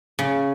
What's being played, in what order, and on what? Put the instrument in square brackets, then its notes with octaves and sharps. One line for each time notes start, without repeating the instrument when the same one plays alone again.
[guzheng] C#3